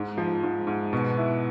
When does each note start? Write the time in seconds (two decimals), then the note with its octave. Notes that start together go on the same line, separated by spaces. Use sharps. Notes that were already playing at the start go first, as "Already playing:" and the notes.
Already playing: G#2
0.18 F3
0.43 G#2
0.67 G#2
0.93 B2
1.17 E4